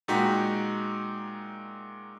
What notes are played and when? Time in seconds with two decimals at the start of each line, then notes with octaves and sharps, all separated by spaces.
0.08 A#2 G#3 D#4 F#4 G5 B6